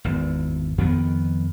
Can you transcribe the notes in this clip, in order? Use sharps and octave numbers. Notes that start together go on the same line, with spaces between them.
G#1 E2
F2 D#3 B3